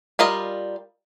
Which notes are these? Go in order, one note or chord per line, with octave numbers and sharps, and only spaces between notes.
G3 F4 A#4 D#5